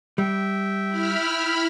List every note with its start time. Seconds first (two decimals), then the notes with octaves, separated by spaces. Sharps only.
0.18 G3 E5 G5
0.88 E4 B5 F6